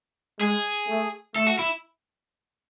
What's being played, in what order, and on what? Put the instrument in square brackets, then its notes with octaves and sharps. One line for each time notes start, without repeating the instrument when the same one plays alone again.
[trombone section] G#3 [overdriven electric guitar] G#4
[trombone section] A3
[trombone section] A3 [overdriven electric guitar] A4
[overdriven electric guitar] F#4
E4